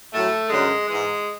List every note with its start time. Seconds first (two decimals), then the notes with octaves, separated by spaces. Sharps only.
0.12 A2 F#3 A3
0.50 F#2 D3 F#3 G#3
0.88 G#2 E3 G#3